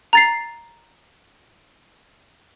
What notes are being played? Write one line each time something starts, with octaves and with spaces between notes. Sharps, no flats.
A#5 A6 C7